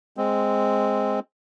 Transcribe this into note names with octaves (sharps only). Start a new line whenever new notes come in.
G#3 C4